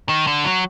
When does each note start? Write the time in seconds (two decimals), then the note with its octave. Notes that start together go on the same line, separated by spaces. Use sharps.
0.09 D#3
0.27 D3
0.45 F#3